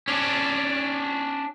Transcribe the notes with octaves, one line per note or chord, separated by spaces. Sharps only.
C#4 D4